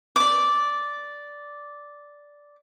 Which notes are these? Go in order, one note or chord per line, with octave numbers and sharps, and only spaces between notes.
D5 D6